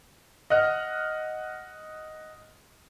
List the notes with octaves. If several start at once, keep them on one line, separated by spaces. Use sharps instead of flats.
D#5 F#5 F6